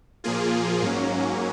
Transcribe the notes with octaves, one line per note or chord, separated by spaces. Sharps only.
A#2 F3 A#3 F4 G#4
G#2 F#3 A#3 C#4